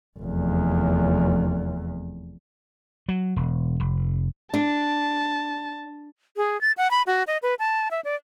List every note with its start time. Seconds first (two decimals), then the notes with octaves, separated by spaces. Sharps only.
0.20 F1 E2
3.09 F#3
3.36 E1
3.80 F1
4.54 D4 A5
6.37 G#4
6.61 A6
6.77 F#5
6.91 B5
7.07 F#4
7.27 D#5
7.43 B4
7.59 A5
7.91 E5
8.04 D5